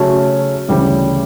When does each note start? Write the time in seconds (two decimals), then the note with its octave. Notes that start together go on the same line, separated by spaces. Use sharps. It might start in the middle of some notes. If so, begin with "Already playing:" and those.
Already playing: C#3 F#3 A3 C#4 F#4
0.68 D2 C#3 E3 G3